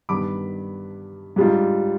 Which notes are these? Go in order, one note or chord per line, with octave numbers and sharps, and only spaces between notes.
G2 D#3 B3 D4 B5 D6
G#2 G3 D4 F4